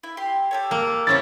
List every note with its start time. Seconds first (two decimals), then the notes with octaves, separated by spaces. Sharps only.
0.03 E4
0.17 G4 C6
0.51 G4 A4 C#5
0.71 A#3
1.07 C3 C#4 E4 A6